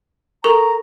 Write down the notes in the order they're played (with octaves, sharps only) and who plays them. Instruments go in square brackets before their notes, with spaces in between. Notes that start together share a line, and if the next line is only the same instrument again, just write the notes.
[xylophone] A4 A#4 C#6 [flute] A#5